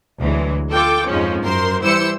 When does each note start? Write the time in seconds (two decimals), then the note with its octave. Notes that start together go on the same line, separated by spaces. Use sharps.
0.19 D2 E3 F#3 G#3
0.69 F4 A4 G5 D6
1.08 F2 G#2 F3 G#3 C#4
1.43 F#2 A#4 C5 C6
1.81 E3 G3 E4 C5 E6 C#7